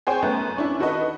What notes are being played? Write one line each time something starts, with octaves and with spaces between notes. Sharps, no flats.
G#4 C5 C#5 G5 G#5
F#2 A3 B3 F#6
C#4 D4 E4
D#3 F#4 A4 B4 D#5